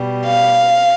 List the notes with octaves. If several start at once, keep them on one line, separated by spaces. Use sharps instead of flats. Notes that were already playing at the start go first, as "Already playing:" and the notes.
Already playing: B2 G3
F5